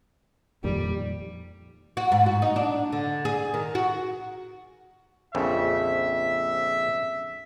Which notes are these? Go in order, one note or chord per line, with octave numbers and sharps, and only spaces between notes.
F2 A#2 D#3 G3
F#4
G#2
F#4
D#4
D4
D3
G#4
D#3
F#4
A#1 F2 C#3 E5